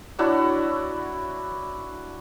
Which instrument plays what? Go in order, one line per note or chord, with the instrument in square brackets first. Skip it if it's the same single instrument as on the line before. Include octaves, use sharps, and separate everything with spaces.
[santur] D4 E4 F#4 C#5